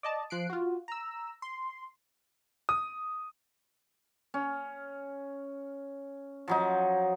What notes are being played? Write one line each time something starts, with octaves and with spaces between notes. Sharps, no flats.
D5 D#5 A5
F3 F#6 C7 D7
F4 F#4
A#5 E6
C6
D#6
C#4
F3 F#3 D#4